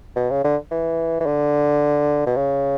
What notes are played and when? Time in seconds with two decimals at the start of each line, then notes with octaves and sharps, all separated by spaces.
0.16 B2
0.30 C#3
0.44 D3
0.71 E3
1.20 E3
1.26 D3
2.26 B2
2.36 C#3